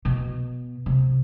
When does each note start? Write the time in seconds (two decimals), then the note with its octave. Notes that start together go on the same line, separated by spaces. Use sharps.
0.05 B2
0.86 C3